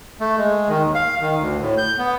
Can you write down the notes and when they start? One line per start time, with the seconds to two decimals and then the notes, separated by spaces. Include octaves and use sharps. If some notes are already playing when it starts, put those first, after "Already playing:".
0.20 A3
0.38 G#3
0.69 D#3
0.83 D#2
0.95 F5
1.21 D#3
1.39 D2
1.61 A2
1.78 G6
1.98 B3